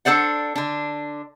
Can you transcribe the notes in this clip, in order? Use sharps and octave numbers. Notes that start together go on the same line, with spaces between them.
D4 A4 C5 D5 F#5
D3 D4